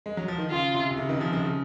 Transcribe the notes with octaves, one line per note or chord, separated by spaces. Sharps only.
G#3
F#3
F3
D#3
C#3 F4
C3
C3
C#3
C3 D#3
C#3 F3
F3 G#3
C#3